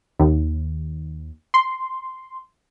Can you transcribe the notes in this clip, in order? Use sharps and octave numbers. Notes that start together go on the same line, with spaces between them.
D#2
C6